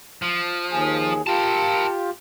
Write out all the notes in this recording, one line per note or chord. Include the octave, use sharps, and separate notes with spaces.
F3
D#2 G#4
F4 G4 A#4 A5